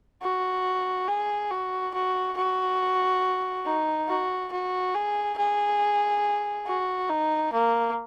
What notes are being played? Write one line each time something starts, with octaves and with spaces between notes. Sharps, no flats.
F#4
G#4
F#4
F#4
F#4
D#4
F#4
F#4
G#4
G#4
F#4
D#4
A#3